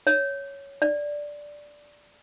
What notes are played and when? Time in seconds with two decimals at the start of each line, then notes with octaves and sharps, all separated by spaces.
0.07 C#5
0.82 D5